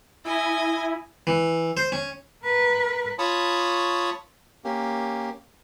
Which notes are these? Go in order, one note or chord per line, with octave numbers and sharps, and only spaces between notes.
E4 D#5 G#5
E3
C5
C#4
A#4 B4
F4 C#5 A5 B5 C#6 D#6
A#3 C#4 G4